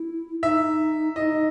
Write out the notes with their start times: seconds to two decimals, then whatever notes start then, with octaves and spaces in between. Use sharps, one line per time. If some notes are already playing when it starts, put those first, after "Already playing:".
Already playing: E4
0.43 D#4 E5
1.16 E4 D#5
1.20 D#4